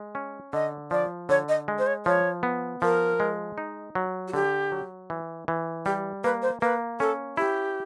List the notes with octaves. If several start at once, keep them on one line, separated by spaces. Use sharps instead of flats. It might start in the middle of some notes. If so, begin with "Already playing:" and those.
Already playing: G#3
C#4
D3 D#5
F3 D5
D3 C#5
D#5
G#3
C5
C#5
F3 C#5
B3
F3 A#4
G#3
D#4
F#3
F#4
D3 G4
F#3
E3
E3
G3 G4
A#3 B4
C5
A#3 B4
C#4 A4
E4 G4